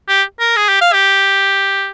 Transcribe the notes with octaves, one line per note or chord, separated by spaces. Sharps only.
G4
A#4
G#4
G4
F5
G4